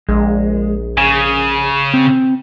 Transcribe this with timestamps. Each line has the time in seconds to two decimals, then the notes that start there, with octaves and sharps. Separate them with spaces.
0.09 A#1 G#3
0.98 C#3 G#5
1.94 C4